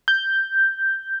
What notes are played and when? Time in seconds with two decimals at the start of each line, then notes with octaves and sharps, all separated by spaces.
0.08 G6